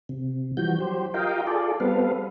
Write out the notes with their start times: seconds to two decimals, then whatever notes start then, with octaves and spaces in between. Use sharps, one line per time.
0.09 C3
0.57 E3 F3 G3 F#4 G6
0.80 F#3 G4 C5
1.14 F4 G4 A#4 D#5 F5 G5
1.47 F4 G#4 A4 D5
1.80 G3 B3 C4 A4 B4 F5